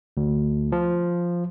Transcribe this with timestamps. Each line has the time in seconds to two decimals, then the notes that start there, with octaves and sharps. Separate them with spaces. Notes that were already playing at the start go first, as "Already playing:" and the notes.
0.17 D2
0.72 F3